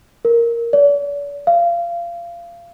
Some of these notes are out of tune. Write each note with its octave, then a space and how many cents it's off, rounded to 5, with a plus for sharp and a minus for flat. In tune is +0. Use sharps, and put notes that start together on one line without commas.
A#4 +0
D5 -45
F5 -25